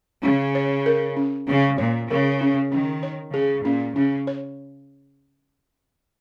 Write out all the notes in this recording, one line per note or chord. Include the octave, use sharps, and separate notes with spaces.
C#3 C#4
C#5
A#4
C#4
C#3 C#4
A#2 C#5
C#3 A#4
C#4
D#3 C#4
C#5
C#3 G#4
A#2 C#4
C#3 C#4
C#5